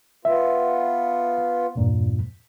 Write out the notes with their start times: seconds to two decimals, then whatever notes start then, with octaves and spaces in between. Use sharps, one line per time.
0.25 B3 F4 E5
1.75 E2 G2 A#2